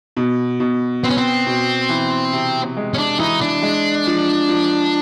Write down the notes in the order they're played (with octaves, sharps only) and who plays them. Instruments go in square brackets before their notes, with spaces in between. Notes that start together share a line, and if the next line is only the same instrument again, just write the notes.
[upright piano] B2
B2
[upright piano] B3 [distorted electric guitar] C4
[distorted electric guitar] C#4
C4
[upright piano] B2
E3
C3
G#3
[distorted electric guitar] C#4
D4
[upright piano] E3 [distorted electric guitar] D#4
[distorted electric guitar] D4
[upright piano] G#3
F3
F3